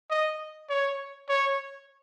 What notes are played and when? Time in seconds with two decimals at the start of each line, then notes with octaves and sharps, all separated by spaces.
0.10 D#5
0.70 C#5
1.29 C#5